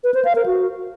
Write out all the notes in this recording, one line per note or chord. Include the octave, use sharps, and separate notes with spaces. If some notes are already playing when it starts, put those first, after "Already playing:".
B4
C5
F5
A#4
F#4